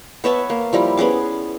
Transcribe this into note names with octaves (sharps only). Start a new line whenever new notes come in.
B3 C#5 E5 A5
A#3
F3 G3 E4
B3 C#4 G#4 D6